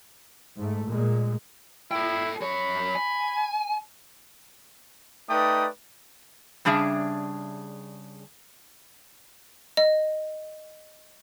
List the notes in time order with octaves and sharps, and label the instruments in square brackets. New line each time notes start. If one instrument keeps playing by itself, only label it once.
[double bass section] G#2 A3
A#2 G#3
[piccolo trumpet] E4 [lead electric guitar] A4 G5
[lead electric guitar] F#2 C#5 [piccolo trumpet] B5
[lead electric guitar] G#5
[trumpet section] A3 D#4 B4 D5 G5 D#6
[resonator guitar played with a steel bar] C#3 G3 D4 G#4 E5
[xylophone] D#5